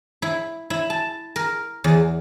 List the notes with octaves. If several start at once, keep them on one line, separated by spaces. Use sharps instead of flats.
E4
E4
A5
A#4
E2